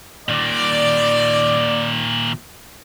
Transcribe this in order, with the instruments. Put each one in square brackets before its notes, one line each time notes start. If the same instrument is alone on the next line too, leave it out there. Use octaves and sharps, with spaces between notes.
[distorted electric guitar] A#2 D#3 [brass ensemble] D5